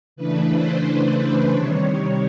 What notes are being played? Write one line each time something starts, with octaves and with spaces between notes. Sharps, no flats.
C#3 E3 A3 D4 B4
C5
C5
C3 D#3 G3 C#5